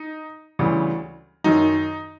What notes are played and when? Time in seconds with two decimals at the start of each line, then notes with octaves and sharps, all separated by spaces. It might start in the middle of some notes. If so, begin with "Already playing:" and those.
Already playing: D#4
0.59 D2 C#3 E3 G3
1.44 F#2 D#3 F#3 D#4